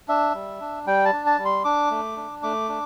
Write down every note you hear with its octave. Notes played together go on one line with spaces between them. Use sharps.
D4 E5
G3
D4
G3 G5
A5
D4
A5
G3
C6
D4 D6
A3
D4
A3 D6
D4